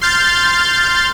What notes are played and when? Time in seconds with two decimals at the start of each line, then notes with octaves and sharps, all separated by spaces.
0.01 C6 F6 G6 A6